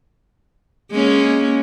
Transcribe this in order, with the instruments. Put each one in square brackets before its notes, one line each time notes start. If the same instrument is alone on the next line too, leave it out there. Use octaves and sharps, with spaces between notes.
[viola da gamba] G#3 A#3 C#4